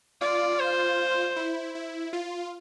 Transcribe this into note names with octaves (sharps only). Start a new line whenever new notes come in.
F4 D5
C5
E4
E4
F4